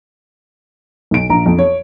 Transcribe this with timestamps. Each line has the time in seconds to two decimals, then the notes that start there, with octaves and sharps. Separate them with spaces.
1.11 B1 D7
1.29 A#1 A#5
1.46 F2
1.59 C#5